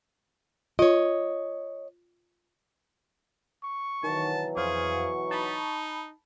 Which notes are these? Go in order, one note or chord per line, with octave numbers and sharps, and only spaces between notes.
F4 C#5 D#5
C#6
B2 D#3 E3 F#3 A5
F2 G#4 C5 F5 C#6
D#4 A5 B5